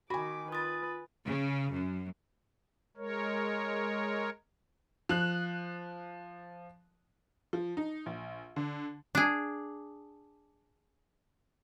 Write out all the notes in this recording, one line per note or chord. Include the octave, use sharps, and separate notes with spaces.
D#3 F#4 G#5 B5 D6
F4 B4 D#6 A6
C#3
F#2
G#3 A#4 C#5
F3 F#6
F3
D#4
A#1
D3
D4 G#4